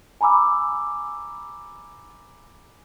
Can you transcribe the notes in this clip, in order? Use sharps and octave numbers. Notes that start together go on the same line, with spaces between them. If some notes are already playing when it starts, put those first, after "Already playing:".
G#5 A#5 B5 D6 E6